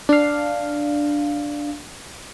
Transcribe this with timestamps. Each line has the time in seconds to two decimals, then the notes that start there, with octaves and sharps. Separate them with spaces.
0.09 D4 F5